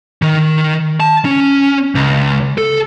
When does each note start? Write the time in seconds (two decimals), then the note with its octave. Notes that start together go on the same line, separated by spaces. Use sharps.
0.22 D#3
1.00 A5
1.25 C#4
1.95 C#2
2.58 A4